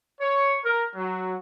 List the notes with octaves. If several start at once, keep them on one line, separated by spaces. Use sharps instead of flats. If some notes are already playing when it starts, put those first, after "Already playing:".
C#5
A#4
F#3